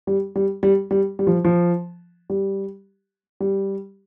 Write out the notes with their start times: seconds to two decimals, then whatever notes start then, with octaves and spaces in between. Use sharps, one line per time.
0.07 G3
0.36 G3
0.63 G3
0.91 G3
1.19 G3
1.27 F3
1.44 F3
2.30 G3
3.40 G3